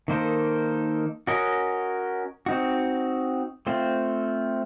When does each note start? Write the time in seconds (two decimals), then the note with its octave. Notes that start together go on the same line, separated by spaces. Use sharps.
0.08 D#3 A#3 D#4 A4 C5
1.27 C#4 F#4 A#4 D#5
2.46 C4 D#4 F#4
3.67 A3 C4 F4 C5